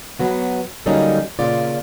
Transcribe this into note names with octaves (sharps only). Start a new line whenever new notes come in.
F#3 B3 F#4
D3 F#3 G3 A#3 C#4 D#4
A#2 C#3 F4 D5